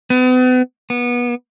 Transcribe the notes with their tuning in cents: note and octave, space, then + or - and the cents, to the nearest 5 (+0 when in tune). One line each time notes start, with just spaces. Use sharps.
B3 +40
B3 -25